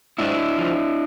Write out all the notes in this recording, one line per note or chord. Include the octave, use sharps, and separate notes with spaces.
G#2 D4 E4
F3